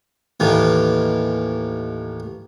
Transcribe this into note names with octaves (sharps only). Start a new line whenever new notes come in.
D#2 A2 E3